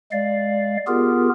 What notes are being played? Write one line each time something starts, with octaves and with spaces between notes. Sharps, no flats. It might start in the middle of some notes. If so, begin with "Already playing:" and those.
G#3 D5 F5
B3 F4 G4 G#4 A#4